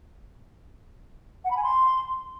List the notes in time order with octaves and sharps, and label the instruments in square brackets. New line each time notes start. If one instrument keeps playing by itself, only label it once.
[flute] F#5
B5
G#5
C6